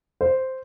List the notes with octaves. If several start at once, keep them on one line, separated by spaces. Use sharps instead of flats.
C5